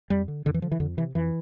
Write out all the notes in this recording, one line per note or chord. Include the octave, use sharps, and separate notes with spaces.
F2 G3
D3
F2 D3
E3
D3 F3
E3
F2 D3
C3 E3
F2 E3